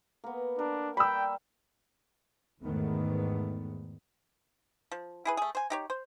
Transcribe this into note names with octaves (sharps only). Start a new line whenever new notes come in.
A#3 B3
D4 A#4
G3 G5 B5 E6
E2 G#2 D#3 A3 B3
F3
E4 G#4 B4
A3 G#4
C5 G#5
D#4 G4 C#5
C5